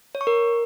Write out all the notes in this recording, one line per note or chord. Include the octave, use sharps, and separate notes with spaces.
C#5
C#6
A#4